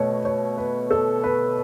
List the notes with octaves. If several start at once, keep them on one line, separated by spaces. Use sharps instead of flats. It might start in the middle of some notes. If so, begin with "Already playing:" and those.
Already playing: B2 A3 C#5
C#5
B4
A4
B4